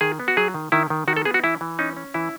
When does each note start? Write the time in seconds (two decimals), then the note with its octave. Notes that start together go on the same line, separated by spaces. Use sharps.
0.01 D#3 G#4
0.20 B3
0.28 F#4
0.37 F#3 G#4
0.54 D#3
0.72 D#3 E4
0.90 D#3
1.08 D#3 F#4
1.16 A4
1.25 B3 G#4
1.34 F#4
1.43 E3 E4
1.61 E3
1.79 C#4 D#4
1.97 C#4
2.14 E3 E4